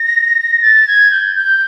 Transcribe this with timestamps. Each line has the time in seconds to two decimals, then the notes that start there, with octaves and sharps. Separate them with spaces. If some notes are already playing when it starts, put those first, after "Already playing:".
Already playing: A#6
0.62 A6
0.88 G#6
1.11 G6
1.36 G6